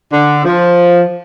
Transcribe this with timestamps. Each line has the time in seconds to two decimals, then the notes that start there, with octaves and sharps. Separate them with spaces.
0.13 D3
0.45 F3